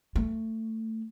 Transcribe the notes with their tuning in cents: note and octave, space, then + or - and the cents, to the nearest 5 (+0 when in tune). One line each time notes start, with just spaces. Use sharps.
A3 +20